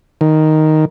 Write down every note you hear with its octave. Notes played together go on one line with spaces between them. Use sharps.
D#3